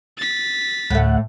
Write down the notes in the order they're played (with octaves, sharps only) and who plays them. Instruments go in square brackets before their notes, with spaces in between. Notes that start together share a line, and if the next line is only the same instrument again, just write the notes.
[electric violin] A6 B6
[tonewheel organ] D2 F#5 [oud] A2 A3